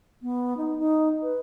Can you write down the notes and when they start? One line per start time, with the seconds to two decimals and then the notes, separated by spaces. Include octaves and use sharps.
0.22 B3
0.57 D#4
0.79 D#4
1.23 B4